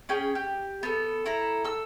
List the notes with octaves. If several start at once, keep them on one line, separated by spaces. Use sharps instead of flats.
C#4 G#4 G5
G4
B3 A4
E4 A4 A#5
A4 E6